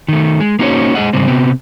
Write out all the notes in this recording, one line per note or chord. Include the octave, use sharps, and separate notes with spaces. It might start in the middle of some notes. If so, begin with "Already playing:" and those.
D#3 A3
G#3
A#3 C#4 D#4 F#4 C5 C#5
G#3 G#4 D#5 F#5
G#2 C#3 G3 C4
C3 B3 C4